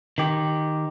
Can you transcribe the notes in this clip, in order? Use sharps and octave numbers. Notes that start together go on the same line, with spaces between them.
D#3 G4